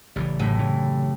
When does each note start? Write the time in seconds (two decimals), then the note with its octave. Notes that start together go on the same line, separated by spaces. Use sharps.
0.16 A1 C#3 E3 G3
0.39 F#2 A2 C3
0.59 C#3 E3